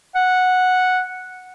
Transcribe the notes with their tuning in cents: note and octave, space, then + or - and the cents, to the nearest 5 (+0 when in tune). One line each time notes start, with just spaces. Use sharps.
F#5 -5